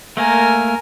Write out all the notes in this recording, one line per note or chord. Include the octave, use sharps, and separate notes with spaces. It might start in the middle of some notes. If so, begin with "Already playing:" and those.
A3 A#3 A#4 G#5